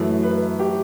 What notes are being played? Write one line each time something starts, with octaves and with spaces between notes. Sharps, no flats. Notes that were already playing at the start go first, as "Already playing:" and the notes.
Already playing: F#2 E3 A3
B4
G4